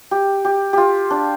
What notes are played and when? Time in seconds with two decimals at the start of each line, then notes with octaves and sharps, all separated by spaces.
0.11 G4
0.45 G4
0.73 F4 G4
1.10 D4